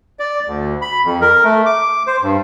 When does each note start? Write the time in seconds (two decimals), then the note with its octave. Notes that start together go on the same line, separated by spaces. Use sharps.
0.19 D5
0.47 D2
0.82 B5
1.05 F2
1.21 A#4
1.44 A3
1.66 D6
2.07 C5
2.22 G2